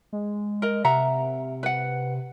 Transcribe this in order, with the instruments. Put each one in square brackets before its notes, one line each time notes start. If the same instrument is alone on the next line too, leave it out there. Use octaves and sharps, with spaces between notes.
[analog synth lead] G#3
[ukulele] A#4 D#5
[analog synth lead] C3 [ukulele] E5 F#5 A#5
[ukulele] B4 F#5